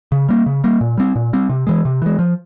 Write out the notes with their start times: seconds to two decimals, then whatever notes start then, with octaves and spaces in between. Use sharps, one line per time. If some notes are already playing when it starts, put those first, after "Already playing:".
0.12 C#3
0.29 G3 A#3
0.46 C#3
0.64 G3 A#3
0.81 A#2
0.98 G3 C4
1.16 A#2
1.33 G3 C4
1.49 C3
1.67 E3 G#3
1.85 C3
2.02 E3 G#3
2.19 F3